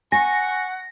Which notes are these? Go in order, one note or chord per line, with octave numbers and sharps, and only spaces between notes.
F#5 G#5 C#6 A#6